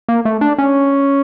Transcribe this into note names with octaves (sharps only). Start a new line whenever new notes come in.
A#3
A3
D4
C#4